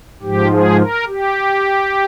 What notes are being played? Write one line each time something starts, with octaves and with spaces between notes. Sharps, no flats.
G#2 F3 G4
G#4
A#4
G4